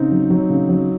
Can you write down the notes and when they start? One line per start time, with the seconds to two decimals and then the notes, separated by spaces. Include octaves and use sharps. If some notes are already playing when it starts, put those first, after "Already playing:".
Already playing: C#3 C4 D#4
0.11 F#3
0.30 F#3
0.50 C#3
0.69 F#3